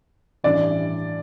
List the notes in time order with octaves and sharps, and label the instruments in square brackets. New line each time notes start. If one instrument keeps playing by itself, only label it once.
[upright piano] A1 G2 E3 D5